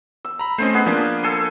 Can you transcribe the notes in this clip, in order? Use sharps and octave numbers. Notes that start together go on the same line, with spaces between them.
E6
A#5 B5
A3 C4 C#4 C5 D#5
B3 G#4
F3 A#3 D4
A4 G#5 C6